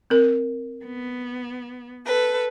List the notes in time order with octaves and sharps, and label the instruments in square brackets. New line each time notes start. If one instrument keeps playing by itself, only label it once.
[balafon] C4 A#4
[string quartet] B3
A4 B4